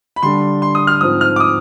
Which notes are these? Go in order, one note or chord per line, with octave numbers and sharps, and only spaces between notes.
B5
D3 G3 D4 C6
C6
D#6
F6
G#2 F3 C4 D#6
F6
D6
D#6